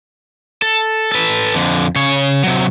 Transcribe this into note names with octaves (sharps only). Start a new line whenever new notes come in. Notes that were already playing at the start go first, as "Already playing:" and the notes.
A4
A4 B4
F2 D3
C#3 C#5
C3 F#3